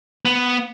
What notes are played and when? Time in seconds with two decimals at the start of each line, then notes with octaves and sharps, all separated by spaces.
0.25 B3